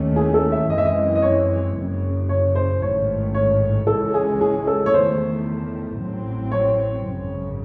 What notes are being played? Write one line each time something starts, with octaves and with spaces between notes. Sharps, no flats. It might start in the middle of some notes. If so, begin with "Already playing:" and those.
Already playing: D#2 D#3 A3 C#4
G#4
A4
E5
F#2 E3 G#3 C4 D#5
E5
D#5
D#5
C#5
F#1 F#2 C#3
C#5
C5
A1 G#2 D#3 A3 C#5
C#5
C#2 C#3 E3 G#3 C#4 A4
G#4
G#4
A4
C#5
E2 D#3 A3 C5
A1 A2 F#3 C4
C#5
G#1 F#2 C#3